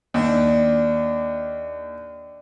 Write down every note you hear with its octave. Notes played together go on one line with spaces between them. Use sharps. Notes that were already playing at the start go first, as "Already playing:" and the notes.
D#2 D4